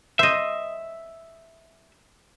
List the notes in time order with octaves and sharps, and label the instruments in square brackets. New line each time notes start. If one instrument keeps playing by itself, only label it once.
[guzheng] C5 D#5 [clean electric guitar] E5